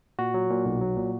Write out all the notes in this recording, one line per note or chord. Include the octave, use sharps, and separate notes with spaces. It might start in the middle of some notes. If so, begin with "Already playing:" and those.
A#2 F#4
F#3
A#2
B1
F#3
A#2